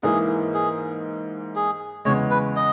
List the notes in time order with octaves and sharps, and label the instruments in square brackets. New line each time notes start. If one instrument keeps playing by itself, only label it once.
[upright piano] G#2 E3 A#3 E4 [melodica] G#4
[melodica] G#4
G#4
[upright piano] E2 C#3 G#3 [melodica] C#5
[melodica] B4
D#5